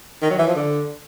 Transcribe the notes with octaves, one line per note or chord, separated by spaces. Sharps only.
D#3
F#3
E3
F3
D3